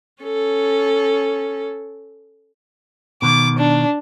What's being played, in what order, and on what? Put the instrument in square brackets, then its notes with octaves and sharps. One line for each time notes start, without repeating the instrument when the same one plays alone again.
[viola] C#4 A4
[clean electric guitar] B2 D#3 [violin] D6
[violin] D4